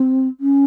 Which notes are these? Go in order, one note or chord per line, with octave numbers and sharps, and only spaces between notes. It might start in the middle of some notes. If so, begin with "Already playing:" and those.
Already playing: C4
C#4